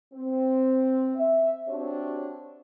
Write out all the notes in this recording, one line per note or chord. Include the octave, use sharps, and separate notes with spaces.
C4
E5
C4 D4 F#4 G4 C#5